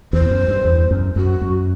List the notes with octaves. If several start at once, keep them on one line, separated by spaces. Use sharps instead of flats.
E2 C5
F#2
G2
E2
F#2
F#2 F#4
F#2